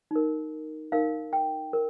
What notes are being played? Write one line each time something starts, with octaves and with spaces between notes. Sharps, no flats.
D#4 A#4
D#4 A#4 F5
G5
A#4